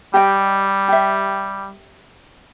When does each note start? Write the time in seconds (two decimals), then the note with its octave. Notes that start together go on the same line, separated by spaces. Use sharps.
0.14 G3 G4 D#5 G5
0.88 G4 E5